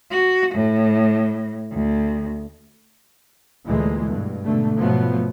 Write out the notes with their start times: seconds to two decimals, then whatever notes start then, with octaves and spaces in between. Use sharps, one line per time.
0.11 F#4
0.55 A2
1.72 D2
3.65 D2 A#2 E3 G#3 A3
4.08 G2 B2
4.43 G#2 B2 D3 A3
4.76 G#2 B2 F3 F#3 A3 B3